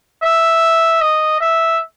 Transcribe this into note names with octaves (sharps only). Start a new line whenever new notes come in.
E5
D#5
E5